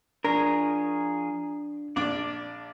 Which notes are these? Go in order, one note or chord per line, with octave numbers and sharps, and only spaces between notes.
F3 D4 G#4 A#4 C#5
A#1 D4 D5 D6